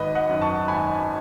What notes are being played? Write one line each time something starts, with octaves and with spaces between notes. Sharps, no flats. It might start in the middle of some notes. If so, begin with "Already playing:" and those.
Already playing: G#1 B4 D#5
D#5 F#5
F#2 D#3
A5 C#6
G#1 G#5 B5